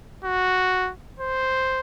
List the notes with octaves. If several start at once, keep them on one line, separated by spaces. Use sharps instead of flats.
F#4
C5